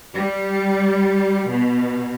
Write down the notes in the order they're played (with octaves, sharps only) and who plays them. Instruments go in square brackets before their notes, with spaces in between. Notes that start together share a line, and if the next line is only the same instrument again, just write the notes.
[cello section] G3
B2